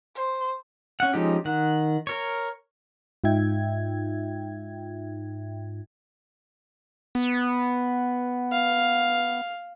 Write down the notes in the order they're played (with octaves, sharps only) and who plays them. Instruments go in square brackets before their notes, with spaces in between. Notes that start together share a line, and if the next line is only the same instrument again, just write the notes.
[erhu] C5
[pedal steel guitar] C#4 F#5
F3 G#3 C#4 D#4 G4
D#3 F#5
A#4 C#5
[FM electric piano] G#2 D#4 F4 E5 G5 G#6
[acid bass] B3
[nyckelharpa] F5